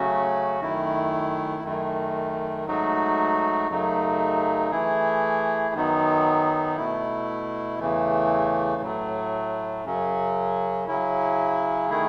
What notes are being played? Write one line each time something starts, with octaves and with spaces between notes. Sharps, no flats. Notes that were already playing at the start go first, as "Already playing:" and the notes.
Already playing: C#3 F#3 A3 C#4 F#4
F#2 D#3 A3 E4
F#2 D#3 A3
G#2 F#3 A3 D#4 F#4
F#2 C#3 F#3 A3 D#4
E3 A3 E4 G#4
F#2 D#3 F#3 B3 D#4
B2 A3 E4
E2 C#3 E3 A3
A2 F#3 A3
F#2 C#3 F#3 C#4
C#3 F#3 C#4 E4
D#3 A3 E4 G#4